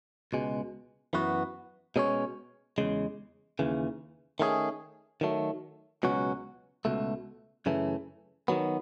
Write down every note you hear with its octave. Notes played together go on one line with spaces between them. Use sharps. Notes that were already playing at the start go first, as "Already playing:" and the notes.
C#2 B2 G#3
F#2 E3 B3 F#4
B2 G#3 C#4 G#4 C#5
E2 C#3 G#3
D#2 C#3 E3
D#3 A3 C#4 E4 G#4
D#3 F#3 A3
C#2 B2 F#3 C#4 F#4
C#2 B2 A3
F#2 C#3 E3 A3
D#3 F#3 B3